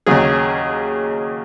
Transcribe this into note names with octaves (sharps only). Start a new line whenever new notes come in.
D#2 C#3 F#3 G#4